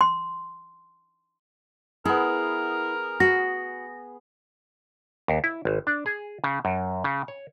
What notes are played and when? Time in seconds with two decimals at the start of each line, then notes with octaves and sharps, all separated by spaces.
0.01 C6
2.05 B3 E4 G#4 A#4
3.20 F#4 A#6
5.28 D#2
5.44 E4
5.65 G#1
5.87 D4
6.06 G#4
6.44 C#3
6.65 F#2
7.04 C#3
7.28 C#5